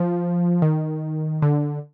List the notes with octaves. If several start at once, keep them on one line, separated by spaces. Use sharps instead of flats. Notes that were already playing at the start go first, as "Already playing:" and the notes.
Already playing: F3
D#3
D3